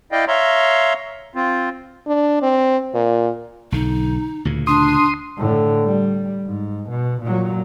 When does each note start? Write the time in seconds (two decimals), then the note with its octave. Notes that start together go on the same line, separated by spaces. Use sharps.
0.12 E4 D5 D#5 F5 G5
0.28 C#5 E5 F5 A#5 C6
1.35 C4 F4
2.07 D4
2.43 C4
2.95 A#2
3.72 B1 D3 D#4
4.45 D2 A#2 C#3
4.67 D4 C6 D#6
5.37 A2 D3
5.84 G3
6.46 G#2
6.90 B2
7.22 A#2 F#3